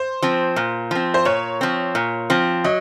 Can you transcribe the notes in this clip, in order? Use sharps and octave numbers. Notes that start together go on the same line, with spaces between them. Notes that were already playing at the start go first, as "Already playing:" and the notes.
Already playing: C5
F3 C4
A#2
F3 C4
C5
A#2 C#5
F3 C4
A#2
F3 C4
F#3 D#5